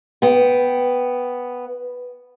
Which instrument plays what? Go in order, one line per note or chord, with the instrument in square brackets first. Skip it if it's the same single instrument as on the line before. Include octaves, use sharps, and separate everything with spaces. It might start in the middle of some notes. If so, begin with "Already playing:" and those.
[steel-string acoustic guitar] B3 G5